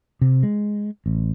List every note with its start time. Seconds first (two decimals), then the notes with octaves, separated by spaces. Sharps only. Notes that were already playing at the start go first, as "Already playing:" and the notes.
0.21 C3
0.43 G#3
1.06 A1